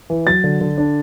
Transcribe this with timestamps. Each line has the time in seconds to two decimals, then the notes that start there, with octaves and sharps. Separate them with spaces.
0.10 E3
0.27 F#3 A6
0.44 D3
0.61 D3
0.78 D4